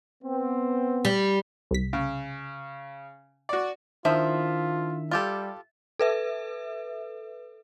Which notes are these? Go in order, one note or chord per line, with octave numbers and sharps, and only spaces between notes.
B3 C4
G3
C2 B6
C#3
F#4 D5
D#3 F3 D4 E4 F4 C5 E5
G3 F4 G4 A4
A4 B4 E5